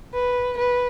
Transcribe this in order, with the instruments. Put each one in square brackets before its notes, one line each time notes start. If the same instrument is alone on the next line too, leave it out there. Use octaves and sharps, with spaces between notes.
[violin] B4
B4